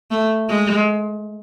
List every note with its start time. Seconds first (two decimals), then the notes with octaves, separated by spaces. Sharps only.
0.11 A3
0.50 G#3